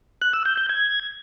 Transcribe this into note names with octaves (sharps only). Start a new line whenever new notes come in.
F#6
E6
G6
G6
G#6